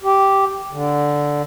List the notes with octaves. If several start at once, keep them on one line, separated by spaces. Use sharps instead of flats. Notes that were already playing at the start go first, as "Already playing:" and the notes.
G4
D3